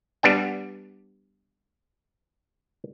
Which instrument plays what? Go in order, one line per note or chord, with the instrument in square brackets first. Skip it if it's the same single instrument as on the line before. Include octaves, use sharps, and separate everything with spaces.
[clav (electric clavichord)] G3 B3 D4 G5